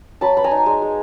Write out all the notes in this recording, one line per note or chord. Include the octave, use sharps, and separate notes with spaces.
F#3 A5 B5
B3 B5
G#5 A#5
D#4
G#3
G#3